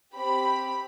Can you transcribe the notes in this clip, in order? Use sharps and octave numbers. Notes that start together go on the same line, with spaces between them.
C4 G4 B5